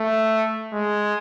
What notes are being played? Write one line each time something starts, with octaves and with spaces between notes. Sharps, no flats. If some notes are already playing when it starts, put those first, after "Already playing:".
Already playing: A3
G#3